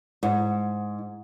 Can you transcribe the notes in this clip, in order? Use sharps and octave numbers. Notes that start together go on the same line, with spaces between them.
G#2